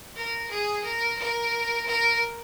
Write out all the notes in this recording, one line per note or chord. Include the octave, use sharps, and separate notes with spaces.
A#4
G#4
A#4
A#4
A#4